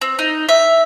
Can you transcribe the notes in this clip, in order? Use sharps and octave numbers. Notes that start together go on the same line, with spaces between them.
C4
D#4
E5